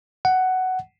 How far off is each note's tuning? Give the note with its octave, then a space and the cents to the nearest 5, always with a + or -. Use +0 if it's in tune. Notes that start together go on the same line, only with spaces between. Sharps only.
F#5 +10